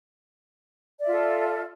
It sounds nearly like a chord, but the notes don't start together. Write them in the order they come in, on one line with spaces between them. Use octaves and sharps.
D5 E5 F4 A4